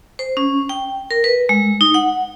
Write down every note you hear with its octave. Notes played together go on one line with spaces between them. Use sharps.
C5
C#4
G5
A#4
B4
G#3
D#4
F#5